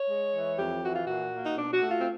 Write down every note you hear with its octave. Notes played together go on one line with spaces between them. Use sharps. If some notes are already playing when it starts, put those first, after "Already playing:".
Already playing: C#5
G#3
E3
F2 G4
E3 F#4
F4
A#2 F#4
A#3
D#4
B2 D4
F#4
A3
F4
C4